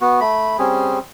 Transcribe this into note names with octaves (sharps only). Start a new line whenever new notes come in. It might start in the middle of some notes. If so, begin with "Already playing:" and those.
B3 F#4
A3 B5
G3 C4 C#4 G#4